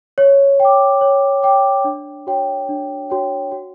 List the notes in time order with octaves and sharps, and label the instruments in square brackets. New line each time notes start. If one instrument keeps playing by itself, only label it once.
[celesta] C#5
G5
D6
C#5
G5 D6
D4
F#4 C#5 G5
D4
F#4 C#5 G5
F#4